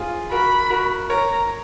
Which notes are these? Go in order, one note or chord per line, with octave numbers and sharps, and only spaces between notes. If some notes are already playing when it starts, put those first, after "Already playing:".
Already playing: F4 G#4
F#4 A#4 B5
F#4 A#4
A#4 C#5 A#5